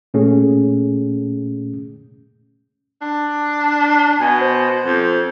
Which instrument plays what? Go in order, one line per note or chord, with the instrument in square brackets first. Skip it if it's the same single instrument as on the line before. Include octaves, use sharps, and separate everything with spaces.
[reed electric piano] A#2 A3 C#4 G#4
[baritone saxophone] D4
[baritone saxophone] B2 [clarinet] G#5
[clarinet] C5
[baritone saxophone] F2